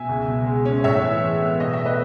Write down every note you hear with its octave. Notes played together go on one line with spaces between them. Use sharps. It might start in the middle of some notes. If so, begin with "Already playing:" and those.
Already playing: B2 E5 G#5
C#2
B2
G#3
C#4
A2 C#5 E5
E3
G#3
B3
B2 D#5
E5
A3
B4 D#5